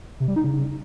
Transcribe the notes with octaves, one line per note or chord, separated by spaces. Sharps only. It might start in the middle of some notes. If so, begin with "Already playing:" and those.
C3
G3
D#4
C#3